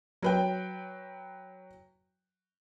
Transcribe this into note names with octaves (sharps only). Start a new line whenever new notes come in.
F#3 B4 G5